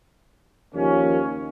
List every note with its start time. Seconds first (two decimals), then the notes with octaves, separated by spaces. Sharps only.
0.74 D#2 C#3 F3 A#3 C#4